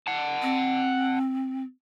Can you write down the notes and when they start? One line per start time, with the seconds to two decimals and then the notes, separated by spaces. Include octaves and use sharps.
0.07 F#5 A5
0.42 C4